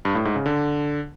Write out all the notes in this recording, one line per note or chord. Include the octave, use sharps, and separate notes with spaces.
G2
A2
G#2
C#3
D3